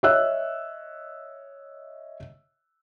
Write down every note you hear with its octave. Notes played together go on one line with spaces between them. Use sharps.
C#5 D#5 E5 E6 F#6